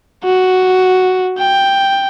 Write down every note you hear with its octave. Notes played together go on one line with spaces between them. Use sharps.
F#4
G5